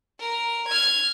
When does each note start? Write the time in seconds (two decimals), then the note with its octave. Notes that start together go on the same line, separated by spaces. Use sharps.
0.19 A#4
0.68 F6 G#6